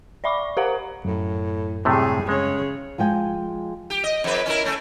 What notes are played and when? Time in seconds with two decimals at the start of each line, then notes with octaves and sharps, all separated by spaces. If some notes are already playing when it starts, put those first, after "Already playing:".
0.24 D5 E5 B5 C#6 D6
0.57 G4 A#4 C5 F5 F#5 A#5
1.05 F#2 A2
1.85 A2 C3 G3 A3 G#4
2.29 C#3 G#3 C#5
2.98 F3 G#3 G5 G#5
3.90 G4
4.04 D#5
4.24 F2 B4
4.46 C#4 E4 A#4
4.64 C#3 A3 C#4